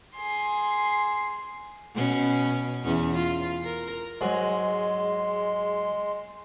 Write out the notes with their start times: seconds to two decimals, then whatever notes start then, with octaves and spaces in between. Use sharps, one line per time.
0.17 G#4 C6
1.95 B2 C#4
2.84 E2 C#4
3.14 F4
3.65 A#4
4.21 G#2 F#3 G#3 G#5 C6